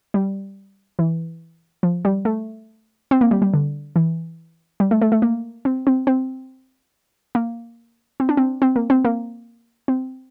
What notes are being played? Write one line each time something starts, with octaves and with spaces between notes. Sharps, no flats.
G3
E3
F3
G3
A3
C4
A#3
G3
G3
D3
E3
G3
A3
A3
A3
A#3
C4
C4
C4
A#3
C4
D4
C4
C4
A#3
C4
A#3
C4